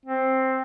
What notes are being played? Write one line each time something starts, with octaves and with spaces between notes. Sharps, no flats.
C4